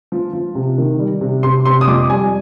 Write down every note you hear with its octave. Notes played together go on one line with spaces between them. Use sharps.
F3
F3
C3
D#3
G3
C3
C3 C6
C3 C6
D#6
F2 D6
G3 G#5